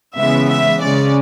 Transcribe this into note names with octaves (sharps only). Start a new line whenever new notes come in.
C#3 E3 G#3 B3 E5
E5
C#3 G#3 C#4 D5